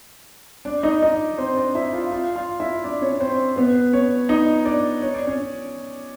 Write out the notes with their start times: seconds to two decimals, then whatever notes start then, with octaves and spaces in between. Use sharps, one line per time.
0.65 D4 D5
0.83 D#4 D#5
1.02 D#4 D#5
1.38 C4 C5
1.56 D4 D5
1.75 E4 E5
1.93 F4 F5
2.11 F4 F5
2.36 F4 F5
2.60 E4 E5
2.84 D4 D5
3.02 C#4 C#5
3.20 C4 C5
3.56 B3 B4
3.93 C#4 C#5
4.29 D#4 D#5
4.65 D4 D5
5.02 C#5
5.14 D5
5.27 C#4 C#5